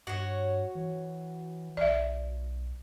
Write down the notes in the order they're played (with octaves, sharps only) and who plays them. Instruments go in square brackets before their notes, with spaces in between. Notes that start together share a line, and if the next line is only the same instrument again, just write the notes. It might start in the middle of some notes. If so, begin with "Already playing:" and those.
[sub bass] G2 [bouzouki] F#4 C#5
[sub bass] E3
[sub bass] B1 [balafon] D5 E5